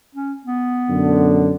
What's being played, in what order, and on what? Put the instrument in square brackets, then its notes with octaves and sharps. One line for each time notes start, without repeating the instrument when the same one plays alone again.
[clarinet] C#4
B3
[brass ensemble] F#2 B2 D3